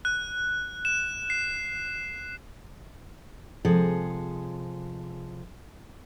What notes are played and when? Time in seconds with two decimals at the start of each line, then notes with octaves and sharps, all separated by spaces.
0.05 F#6
0.85 E7
1.30 C7
3.65 C3 F3 G#3 G#4 A4